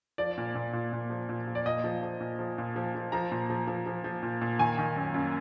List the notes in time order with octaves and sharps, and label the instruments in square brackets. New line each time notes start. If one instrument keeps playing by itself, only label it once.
[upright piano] F3 D5
A#2
A#2
A#2
A#2
F3
A#2
F3
D5
A#2 D#5
F3
F3
A#2
F3
A#2
F3
F3
F3 A#5
A#2
F3
F3
F3
F3
A#2
A#2
D#3 G#5
D#3
F#2
F#2